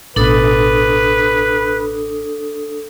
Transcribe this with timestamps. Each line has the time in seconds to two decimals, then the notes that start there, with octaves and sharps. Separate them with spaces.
0.16 A1 B2 D4 A4 B4 D#6